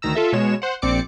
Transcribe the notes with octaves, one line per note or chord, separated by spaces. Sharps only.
D2 D#3 A#5 E6
F4 A4 E5
B2 G#3 C#5 E7
C5 F#5
A#1 C4 D5 D6 C#7